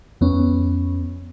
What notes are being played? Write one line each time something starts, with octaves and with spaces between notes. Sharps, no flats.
F2 B3 C#4